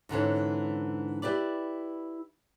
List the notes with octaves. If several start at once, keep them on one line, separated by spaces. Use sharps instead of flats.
G#2 D3 E3 C#4
E4 G4 B4 D5